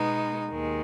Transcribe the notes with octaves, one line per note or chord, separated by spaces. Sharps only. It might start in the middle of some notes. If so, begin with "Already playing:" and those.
Already playing: B2 G#3 B3 D#4
D#2 D#3 G#3